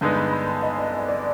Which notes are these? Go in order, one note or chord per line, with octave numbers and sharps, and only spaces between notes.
G2 D3 G#3 B3 D#4 G6
B5
B5
G#5
D#5
D5
D#5
D5